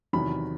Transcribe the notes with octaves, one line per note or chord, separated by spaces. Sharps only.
E2 C3 D#3 F#3 B5